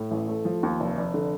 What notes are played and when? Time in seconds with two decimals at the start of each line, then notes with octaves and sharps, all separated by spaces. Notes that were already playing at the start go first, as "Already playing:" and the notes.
Already playing: A2
0.11 A1
0.28 A3
0.45 F3
0.63 D#2
0.80 F1
0.97 F1
1.14 D3